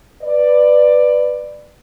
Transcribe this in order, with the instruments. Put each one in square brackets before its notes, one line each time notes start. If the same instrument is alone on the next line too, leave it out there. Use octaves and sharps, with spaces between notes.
[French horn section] B4 D5